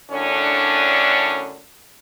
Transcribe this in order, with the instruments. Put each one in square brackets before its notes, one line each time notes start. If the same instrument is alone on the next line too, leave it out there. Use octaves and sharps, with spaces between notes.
[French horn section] F#2 A2 D3 C#4 D4